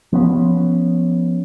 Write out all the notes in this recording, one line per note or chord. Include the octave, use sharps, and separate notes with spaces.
F3 B3 C#4